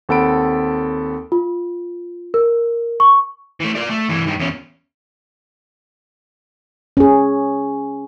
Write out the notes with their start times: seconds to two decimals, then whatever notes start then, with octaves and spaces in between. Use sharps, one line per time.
0.09 D#2 C4 A4 F#5 B5 D7
1.32 F4
2.34 A#4
3.00 C#6
3.60 E3 A3
3.75 F4 D5
3.90 A3
4.09 G2 E3
4.27 G2 D#3
4.39 E2 C#4
6.97 C#4 G#4